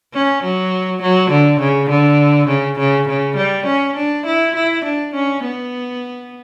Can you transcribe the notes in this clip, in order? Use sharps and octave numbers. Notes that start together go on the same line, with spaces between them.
C#4
F#3
F#3
D3
C#3
D3
C#3
C#3
C#3
G3
C#4
D4
E4
E4
D4
C#4
B3